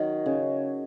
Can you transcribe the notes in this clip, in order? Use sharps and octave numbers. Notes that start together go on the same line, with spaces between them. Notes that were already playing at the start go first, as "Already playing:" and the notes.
Already playing: D#3 F#3
C#3